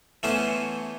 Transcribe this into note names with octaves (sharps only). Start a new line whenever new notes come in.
E3 A3 B3 C#4 C5